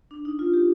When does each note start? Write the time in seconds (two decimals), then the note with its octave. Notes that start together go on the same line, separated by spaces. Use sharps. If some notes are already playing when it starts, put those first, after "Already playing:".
0.11 D4
0.25 D#4
0.39 F4
0.54 G4